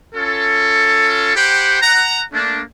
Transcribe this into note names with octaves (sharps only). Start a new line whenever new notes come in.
C#4 F4 A4
G4 C5 F#5 G5 B5
F#5 A#5
A3 A#3 D4